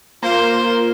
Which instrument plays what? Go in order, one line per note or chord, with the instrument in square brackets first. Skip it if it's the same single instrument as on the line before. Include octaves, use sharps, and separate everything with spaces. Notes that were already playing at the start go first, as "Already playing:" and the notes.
[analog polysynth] A#3 [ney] F4 [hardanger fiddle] C5